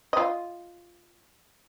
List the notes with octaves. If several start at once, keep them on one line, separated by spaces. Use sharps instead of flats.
F4 D#5